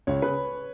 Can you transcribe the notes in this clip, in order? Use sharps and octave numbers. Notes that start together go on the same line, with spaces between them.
C#2 C#5
C#3 B4